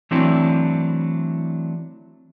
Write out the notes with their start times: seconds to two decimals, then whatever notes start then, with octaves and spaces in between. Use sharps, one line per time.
0.11 E3 F#3 A3 C4 D4 E4